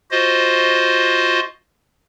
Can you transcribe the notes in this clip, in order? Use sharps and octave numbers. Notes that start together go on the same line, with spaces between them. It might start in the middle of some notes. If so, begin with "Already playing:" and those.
F4 F#4 C5 D#5